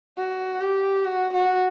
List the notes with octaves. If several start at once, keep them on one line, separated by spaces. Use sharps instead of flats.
F#4
G4
F#4
F#4